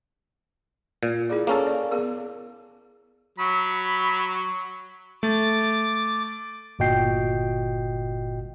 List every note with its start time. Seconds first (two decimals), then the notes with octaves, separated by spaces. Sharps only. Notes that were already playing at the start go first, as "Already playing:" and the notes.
1.03 A#2
1.30 E4 G#4 D5
1.47 A#3 C#4 G#4 A4
1.67 D5
1.91 B3 G#4 A#4
3.38 F#3 B5
5.23 A3 D6 A6
6.79 G1 A#2 F#4 D#5 G5 C7